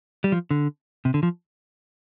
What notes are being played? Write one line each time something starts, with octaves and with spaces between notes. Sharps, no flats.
G3
F3
D3
C3
D3
F3